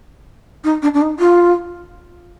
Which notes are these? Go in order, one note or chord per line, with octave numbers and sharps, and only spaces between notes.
D#4
D4
D4
D#4
F4